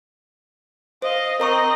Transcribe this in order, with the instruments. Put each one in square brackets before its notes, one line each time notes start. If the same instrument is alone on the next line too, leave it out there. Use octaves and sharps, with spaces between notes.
[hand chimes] C5 [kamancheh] D#5 F5
[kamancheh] C4 D#5 [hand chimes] A#4 A#5 C#6